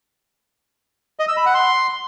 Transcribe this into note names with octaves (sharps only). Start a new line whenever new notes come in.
D#5
E6
B5
F#5
C6